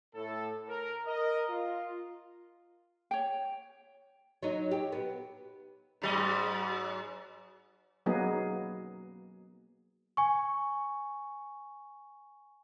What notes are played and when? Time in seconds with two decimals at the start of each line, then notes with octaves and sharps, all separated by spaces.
0.15 A2 A4
0.68 A#4
1.06 A#4 D#5
1.50 F4
3.11 C#5 G5
4.43 F#3 D#4
4.71 G4
4.92 B3
6.02 G#2 F#3 D#5
8.06 F#3 A#3 B3 D#4 G#4
10.17 G#5 C#6